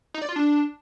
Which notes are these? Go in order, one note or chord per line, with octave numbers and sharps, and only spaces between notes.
D#4
D5
F4
D4